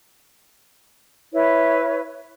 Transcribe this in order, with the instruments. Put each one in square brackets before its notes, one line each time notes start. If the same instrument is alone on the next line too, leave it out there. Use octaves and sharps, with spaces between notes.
[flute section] E4 B4 C#5